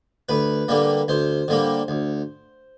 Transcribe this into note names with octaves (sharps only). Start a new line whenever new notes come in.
D2 B4
D3 G3 A#3
D2 C5
D3 G3 A#3
D2